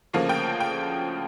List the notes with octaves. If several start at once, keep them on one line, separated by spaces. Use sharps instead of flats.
D2 C#3 F3 A#3
G5
G5